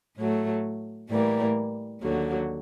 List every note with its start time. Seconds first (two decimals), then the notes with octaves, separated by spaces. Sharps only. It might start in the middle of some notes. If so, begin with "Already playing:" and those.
0.17 A2 F#3 A3
1.10 A2 E3 G3 A#3
2.02 D#2 D3 F#3